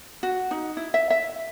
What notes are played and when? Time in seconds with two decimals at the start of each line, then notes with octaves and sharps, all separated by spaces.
0.23 F#4
0.51 D#4
0.77 E4
0.94 E5
1.10 E5